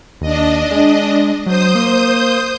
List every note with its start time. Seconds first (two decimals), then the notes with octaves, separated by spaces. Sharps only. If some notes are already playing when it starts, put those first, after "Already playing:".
0.21 D#2 D4 D#5
0.71 G#3
1.46 F#3 C5 D#6 G6
1.75 A#3